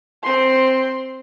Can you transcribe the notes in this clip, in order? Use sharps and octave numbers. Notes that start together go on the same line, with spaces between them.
C4 C6